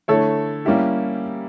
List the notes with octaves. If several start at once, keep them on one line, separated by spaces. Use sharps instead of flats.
D3 A3 E4 A4 C#5
G3 A#3 C#4 E4 G4